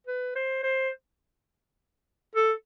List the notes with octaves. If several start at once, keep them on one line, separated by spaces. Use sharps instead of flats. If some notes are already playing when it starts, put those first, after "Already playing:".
B4
C5
C5
A4